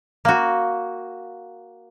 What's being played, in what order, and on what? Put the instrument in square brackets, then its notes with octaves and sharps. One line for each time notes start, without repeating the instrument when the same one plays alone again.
[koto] A#3 F#4